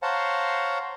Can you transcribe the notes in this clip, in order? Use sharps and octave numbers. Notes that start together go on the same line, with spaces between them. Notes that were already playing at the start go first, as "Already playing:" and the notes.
C5 C#5 F5 F#5 A5 A#5